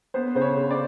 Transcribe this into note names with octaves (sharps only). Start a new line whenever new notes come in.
B3 C5
C#3 C5
C#5
C#3
D5